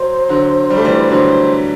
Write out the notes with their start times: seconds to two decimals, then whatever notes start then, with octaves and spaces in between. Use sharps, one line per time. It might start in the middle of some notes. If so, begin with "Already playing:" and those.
Already playing: F#3 C5
0.29 D3 F#3
0.70 G3
0.77 A3
0.85 E3 G3
1.10 D3 F#3 C5